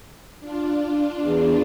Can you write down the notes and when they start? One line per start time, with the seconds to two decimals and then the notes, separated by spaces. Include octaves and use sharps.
0.40 D4 F4
1.23 E2